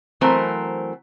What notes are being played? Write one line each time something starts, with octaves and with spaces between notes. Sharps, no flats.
E3 F#3 A3 C4 A#4 C5